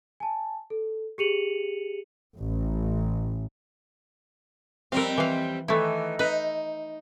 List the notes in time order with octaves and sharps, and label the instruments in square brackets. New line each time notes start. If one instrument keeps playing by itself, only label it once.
[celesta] G#5 A5
A4
G4 G#4 C#7 D#7 F7 F#7
[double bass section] A1
[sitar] F2 G3 C4 [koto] A#4 F5
[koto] E3 F5
[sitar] D#3 E3 [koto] A3 E4
[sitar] D#4 [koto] B4